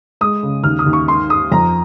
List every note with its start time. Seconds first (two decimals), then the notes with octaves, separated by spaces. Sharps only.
0.21 G#3 D#6
0.43 C#3
0.64 D#2 F6
0.79 D#6
0.86 D#2
0.93 C#6
1.08 G#2 C6
1.29 G#2 D#6
1.52 F2 A#5